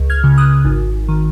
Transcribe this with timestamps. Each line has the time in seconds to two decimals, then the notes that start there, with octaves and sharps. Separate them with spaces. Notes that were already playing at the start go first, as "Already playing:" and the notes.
Already playing: C#2
0.10 F6 G#6
0.24 C#3
0.37 D#6 F#6
0.65 G#1
1.09 D#3